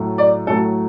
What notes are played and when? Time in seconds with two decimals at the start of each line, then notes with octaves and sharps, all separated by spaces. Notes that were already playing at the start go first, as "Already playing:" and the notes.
Already playing: A2 F#3 A3
0.18 D5
0.47 A2 F#3 A3 A4